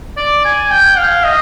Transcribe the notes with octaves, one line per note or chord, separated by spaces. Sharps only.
D5
G#5
G5
F5
D#5